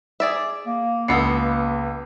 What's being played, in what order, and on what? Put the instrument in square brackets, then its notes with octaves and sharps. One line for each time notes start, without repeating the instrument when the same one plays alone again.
[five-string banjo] G#4 D5 E5
[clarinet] A#3
[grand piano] C#2 C7 C#7 [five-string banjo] G#3 B3 A4